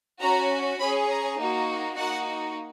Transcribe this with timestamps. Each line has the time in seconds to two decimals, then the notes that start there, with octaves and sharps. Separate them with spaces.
0.20 C#4 F#4 A#5
0.79 C#4 G#4 B5
1.09 A#5
1.38 A#3 D#4 F#4
1.97 A#3 D#4 F#4 F#5